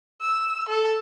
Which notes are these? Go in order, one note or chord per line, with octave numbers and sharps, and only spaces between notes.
E6
A4